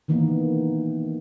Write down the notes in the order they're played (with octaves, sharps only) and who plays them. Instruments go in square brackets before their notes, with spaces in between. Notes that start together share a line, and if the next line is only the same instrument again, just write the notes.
[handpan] D#3 E3 A#3 B3 D#4